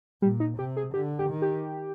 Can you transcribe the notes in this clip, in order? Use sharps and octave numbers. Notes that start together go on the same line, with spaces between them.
A#2 G3
D#4
C3 G4
G#4
D3 G4
G4
D#3
G4